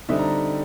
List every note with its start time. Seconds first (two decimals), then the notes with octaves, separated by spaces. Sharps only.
0.09 D3 G3 C4 D#4 E5
0.19 A#5